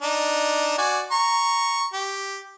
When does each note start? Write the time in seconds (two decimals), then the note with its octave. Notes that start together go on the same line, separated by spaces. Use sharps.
0.02 D4 D#4
0.78 F#4 D5 G#5
1.11 A#5 C#6
1.93 G4